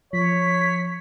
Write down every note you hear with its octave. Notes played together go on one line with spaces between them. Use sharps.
F3 C#5 B6